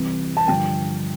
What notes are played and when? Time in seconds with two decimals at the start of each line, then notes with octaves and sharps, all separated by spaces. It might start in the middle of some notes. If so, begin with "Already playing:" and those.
Already playing: C2 C3 E3
0.37 A5
0.48 G2 D3 F3 G5